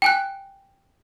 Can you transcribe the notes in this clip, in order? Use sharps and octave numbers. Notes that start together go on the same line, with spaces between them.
G5 G#5 F#6